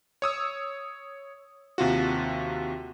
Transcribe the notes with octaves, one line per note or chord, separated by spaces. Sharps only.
C#5 D#6 E6
D#2 C3 F4 F#4